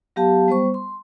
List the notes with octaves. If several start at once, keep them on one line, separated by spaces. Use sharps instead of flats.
F#3 B3 G4 F5 A5
G3 B3 C5 C#6
C6